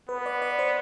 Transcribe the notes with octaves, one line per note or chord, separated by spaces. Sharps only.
B3 B4
D5
D5
C5